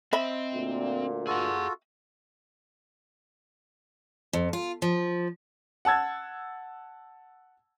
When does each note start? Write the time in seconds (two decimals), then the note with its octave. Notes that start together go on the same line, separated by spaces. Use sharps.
0.13 C4 D#5 E5 B5
0.54 D2 A#2
1.27 F4 F#4 G#4 A4 F#5
4.33 F2
4.53 F4
4.82 F3
5.85 F#5 A5 E6 G#6 A6